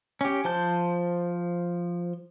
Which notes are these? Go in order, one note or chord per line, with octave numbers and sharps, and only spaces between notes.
C#4 G4
F3 C5 A5 G6